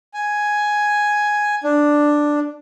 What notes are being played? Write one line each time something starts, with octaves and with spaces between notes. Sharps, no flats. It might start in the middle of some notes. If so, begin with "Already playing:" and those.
G#5
D4